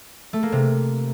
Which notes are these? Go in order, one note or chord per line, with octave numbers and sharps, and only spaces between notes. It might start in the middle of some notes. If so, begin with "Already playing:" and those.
A3
A#3
C3